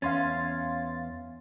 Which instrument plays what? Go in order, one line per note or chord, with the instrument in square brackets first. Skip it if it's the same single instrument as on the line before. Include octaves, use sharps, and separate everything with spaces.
[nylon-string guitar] E2 [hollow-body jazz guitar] C#4 [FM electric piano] F5 C6 A6